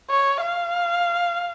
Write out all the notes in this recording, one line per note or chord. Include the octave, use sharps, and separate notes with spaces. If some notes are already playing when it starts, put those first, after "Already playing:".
C#5
F5